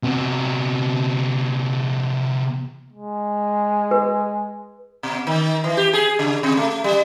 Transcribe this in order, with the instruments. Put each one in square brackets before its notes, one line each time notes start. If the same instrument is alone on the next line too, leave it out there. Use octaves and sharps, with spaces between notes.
[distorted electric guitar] C3 B3
[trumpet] G#3
[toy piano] B4
[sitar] B2
D#3
E3
G4
G#4
C#3
C3
A3
G3